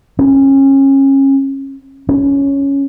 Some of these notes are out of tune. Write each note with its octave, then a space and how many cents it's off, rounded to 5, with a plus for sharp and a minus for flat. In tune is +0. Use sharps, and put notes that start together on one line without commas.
C#4 -25
C#4 +5